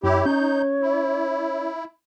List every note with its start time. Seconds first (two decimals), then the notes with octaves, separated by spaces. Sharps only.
0.04 F#2 E4 G4 C#5
0.26 C#4 D#4 G6
0.82 E4